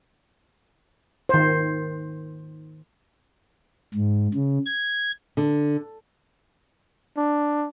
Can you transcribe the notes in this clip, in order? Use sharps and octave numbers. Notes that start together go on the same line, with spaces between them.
D#3 C5
G#2
C#3
G#6
D3
D4